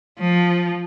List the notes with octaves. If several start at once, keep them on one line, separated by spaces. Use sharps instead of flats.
F3